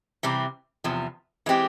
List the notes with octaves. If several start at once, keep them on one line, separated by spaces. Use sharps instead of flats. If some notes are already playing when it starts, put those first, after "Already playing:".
C3 E3 G3 C4
E2 C3 F3
E3 G#3 C4 G4